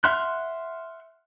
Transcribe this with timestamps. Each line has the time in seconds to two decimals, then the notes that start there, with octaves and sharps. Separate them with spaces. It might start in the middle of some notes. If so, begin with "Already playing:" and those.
0.04 E5 F#5 C6 F6 F#6